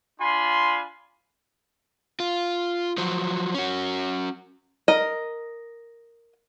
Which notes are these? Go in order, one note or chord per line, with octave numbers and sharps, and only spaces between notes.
D4 F4 G#5 B5 C6
F4
F3 F#3
C#4 F#4
A#4 D#5